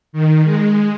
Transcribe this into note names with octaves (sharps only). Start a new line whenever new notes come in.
D#3
G#3